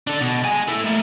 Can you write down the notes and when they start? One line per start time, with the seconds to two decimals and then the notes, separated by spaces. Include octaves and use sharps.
0.07 D4 A4
0.21 B2
0.43 G#3 G#5
0.68 E4 A4
0.84 A3 A#3